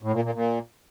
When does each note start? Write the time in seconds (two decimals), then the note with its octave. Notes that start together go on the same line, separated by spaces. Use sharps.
0.03 A2
0.13 A#2
0.24 A#2
0.35 A#2